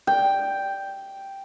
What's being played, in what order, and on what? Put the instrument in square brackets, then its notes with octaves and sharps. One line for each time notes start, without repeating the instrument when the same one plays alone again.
[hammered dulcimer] G5